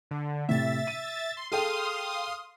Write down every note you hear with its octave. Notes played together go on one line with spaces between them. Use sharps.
D3
A2 C3 E5 A6
D#7
C6
G#4 A4 F5 G5 C6 D#6